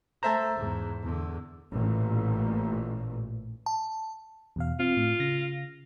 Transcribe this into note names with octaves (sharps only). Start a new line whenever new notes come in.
A3 C5 E5 A5 A#5
E2 G#2
E2 D3
A1 A#2
A5
E2 B2 F5
C4 F4
A2
C#3 A#6